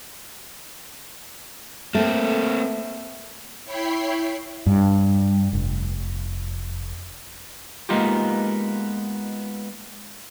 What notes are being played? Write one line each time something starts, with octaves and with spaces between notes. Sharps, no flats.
A3 A#3 C4
E4 C#5 G5 B5 C7
G2
F1
G#3 A#3 B3 D#4 F4 G4